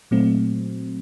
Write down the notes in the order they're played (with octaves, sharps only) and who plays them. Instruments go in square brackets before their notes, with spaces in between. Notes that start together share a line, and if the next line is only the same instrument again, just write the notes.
[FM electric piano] A#2 F#3 A3 C4